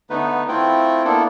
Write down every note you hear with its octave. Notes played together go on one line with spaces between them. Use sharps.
D3 A3 B3 D#4 B4
A3 C4 E4 F4 G5
A#3 B3 D4 E4 A4